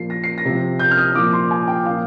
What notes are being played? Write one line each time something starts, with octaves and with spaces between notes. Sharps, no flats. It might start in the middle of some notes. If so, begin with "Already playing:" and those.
Already playing: A#2 F3 C7
A#6
C7
A#6
C3 F3
G6
F6
D#6
A#2 F3 D6
C6
G#5
G5
A#2 F3 F5